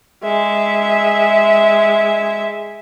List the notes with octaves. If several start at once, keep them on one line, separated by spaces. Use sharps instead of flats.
G#3 E5